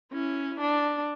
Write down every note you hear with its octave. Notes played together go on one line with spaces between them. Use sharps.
C#4 E4
D4